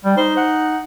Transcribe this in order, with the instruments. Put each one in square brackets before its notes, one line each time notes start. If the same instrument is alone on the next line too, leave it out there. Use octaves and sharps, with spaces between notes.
[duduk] G3
[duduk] D#4 [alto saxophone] C5
[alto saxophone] F#5